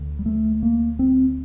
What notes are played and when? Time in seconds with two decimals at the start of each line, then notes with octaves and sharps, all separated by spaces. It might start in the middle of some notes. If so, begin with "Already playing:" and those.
Already playing: D2 D3
0.19 G3
0.26 A3
0.63 A#3
0.99 C4